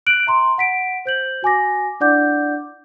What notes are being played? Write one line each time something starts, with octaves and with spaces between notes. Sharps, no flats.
F#6 D7 F#7
E5 A#5 C6
F#5 B6 D7
C5 G6 F#7
F#4 G#5 D6 A#6
D4 E4 D5 F#5 D6 G6